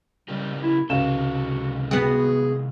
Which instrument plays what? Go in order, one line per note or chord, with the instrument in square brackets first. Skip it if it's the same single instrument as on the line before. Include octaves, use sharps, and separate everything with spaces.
[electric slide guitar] C#3 A#3 G4 [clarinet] G3
[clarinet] E4
[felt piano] C#2 F5 E7 [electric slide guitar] C3 G#3 A4 [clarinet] F#4
[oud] B3 F#4 [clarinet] G#4